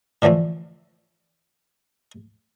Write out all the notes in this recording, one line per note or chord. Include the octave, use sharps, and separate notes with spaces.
A2 D3 E3 F3 A3